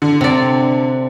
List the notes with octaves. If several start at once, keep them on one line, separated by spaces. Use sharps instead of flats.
D3
C3 D5